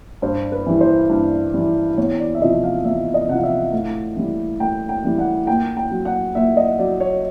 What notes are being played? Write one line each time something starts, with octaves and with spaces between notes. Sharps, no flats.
G2 C5
B4
E3 G3
C5
G2
E3 G3
E2 C#5
D5
E5
C3 F3 D#5
F5
E2 E5
D#5
C3 F3 F5 F#5
E5
A2 F5
E3 G3
A2 G5
G5
E3 G3
F#5
A#2 G5
G5
F#3
F#5
A#2 E5
D#5
F#3 D5
C#5